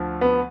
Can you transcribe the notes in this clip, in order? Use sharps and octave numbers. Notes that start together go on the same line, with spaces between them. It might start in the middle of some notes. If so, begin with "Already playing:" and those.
Already playing: D2 D3 F3
B3